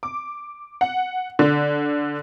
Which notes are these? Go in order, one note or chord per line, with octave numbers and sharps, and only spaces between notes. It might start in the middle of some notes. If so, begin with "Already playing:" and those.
D6
F#5
D3